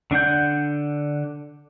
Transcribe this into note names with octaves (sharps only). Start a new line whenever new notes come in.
D3 D4 F#5 G6